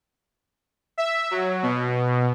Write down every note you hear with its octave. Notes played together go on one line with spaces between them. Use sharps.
E5
F#3
B2